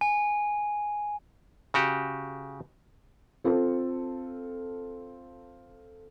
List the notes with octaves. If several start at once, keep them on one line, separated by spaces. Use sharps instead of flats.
G#5
C#3 F#4 G4
C4 F4 A4